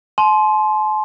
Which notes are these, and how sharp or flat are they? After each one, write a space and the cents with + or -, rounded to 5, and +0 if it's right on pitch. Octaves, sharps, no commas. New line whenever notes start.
A5 -45 C6 +0